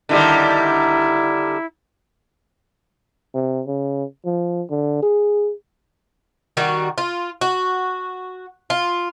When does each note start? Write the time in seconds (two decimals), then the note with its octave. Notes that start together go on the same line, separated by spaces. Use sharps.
0.09 D3 D#3 G3 E4
3.34 C3
3.67 C#3
4.25 F3
4.70 D3
5.02 G#4
6.57 D#3 G3 F#4
6.98 F4
7.41 F#4
8.70 F4